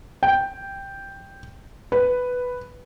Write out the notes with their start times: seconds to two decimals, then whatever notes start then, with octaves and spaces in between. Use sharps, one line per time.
0.23 G5
1.92 B4